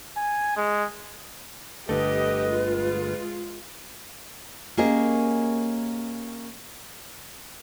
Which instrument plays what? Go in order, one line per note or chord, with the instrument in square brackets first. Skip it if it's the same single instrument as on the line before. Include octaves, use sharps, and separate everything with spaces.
[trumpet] G#5
G#3
[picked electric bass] G1 D3 A3 [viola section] G4 A4 D#5 [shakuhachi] B4
[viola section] G#3 F4
[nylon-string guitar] A#3 C#4 G4 G#4 A#4 D#5